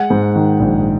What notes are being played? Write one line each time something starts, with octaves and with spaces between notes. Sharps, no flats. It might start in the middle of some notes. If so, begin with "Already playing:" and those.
Already playing: G#3 F#5
G#2
D#3
A#1